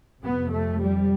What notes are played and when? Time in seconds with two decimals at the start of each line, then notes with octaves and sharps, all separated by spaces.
0.22 F2 C3 B3
0.51 A3
0.79 G3